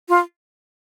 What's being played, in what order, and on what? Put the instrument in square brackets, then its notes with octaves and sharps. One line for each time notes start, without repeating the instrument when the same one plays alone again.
[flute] F4